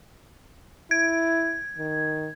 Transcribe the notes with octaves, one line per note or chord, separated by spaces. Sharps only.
E4 G#6
D#3